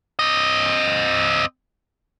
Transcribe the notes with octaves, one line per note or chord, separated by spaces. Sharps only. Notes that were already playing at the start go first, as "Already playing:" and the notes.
C4 D#5